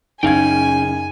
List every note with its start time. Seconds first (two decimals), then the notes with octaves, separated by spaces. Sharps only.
0.23 F#1 C#4 D#4 G#4 F5 G5 G#5 G#6